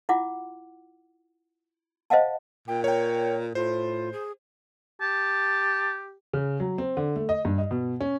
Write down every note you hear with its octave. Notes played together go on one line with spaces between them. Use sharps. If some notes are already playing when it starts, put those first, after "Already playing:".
E4 F4 F#5 D6
C5 D#5 F5 F#5 A5
A#2 G5
A#4 C#5 G5
A2 F4 C5
G#4
G4 A5
C#3
F#3
C4
D3
A3
D#5
G2
D#5
B2
C#4